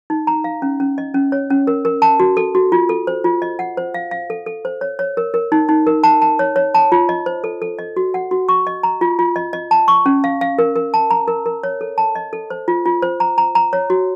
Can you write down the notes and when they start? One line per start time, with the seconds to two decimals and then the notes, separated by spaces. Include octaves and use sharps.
0.10 D#4
0.27 A#5
0.44 F5
0.62 C#4
0.80 C#4
0.98 D#5
1.14 C#4
1.32 C#5
1.50 C#4
1.67 A#4
1.85 A#4
2.02 A5
2.20 F#4
2.37 A4
2.55 F#4
2.72 F4
2.89 A4
3.07 C5
3.24 F4
3.42 D#5
3.59 F#5
3.77 C5
3.94 F5
4.11 F5
4.30 A4
4.46 A4
4.65 C5
4.81 C#5
4.99 C#5
5.17 A#4
5.34 A#4
5.52 D#4
5.69 D#4
5.87 A#4
6.03 A5
6.22 A5
6.39 C#5
6.56 C#5
6.74 A5
6.92 F4
7.09 D#5
7.26 C5
7.44 A4
7.62 A4
7.79 D#5
7.97 F#4
8.14 F#5
8.31 F#4
8.49 C#6
8.67 D#5
8.83 A#5
9.01 F4
9.19 F4
9.36 D#5
9.53 D#5
9.71 A5
9.88 C#6
10.06 C#4
10.24 F5
10.41 F5
10.59 A#4
10.76 A#4
10.94 A5
11.11 A#5
11.28 A#4
11.46 A#4
11.63 C#5
11.81 A4
11.98 A5
12.15 D#5
12.33 A4
12.50 C5
12.68 F4
12.85 F4
13.02 C5
13.20 A#5
13.38 A#5
13.55 A#5
13.73 C#5
13.90 F#4